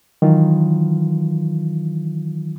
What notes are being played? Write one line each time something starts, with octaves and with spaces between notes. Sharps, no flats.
D#3 E3 F#3 F4